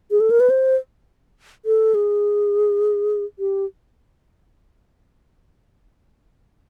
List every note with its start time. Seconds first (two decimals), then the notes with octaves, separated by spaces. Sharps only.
0.11 G#4
0.20 A4
0.30 A#4
0.40 B4
0.50 C5
1.65 A4
1.94 G#4
3.39 G4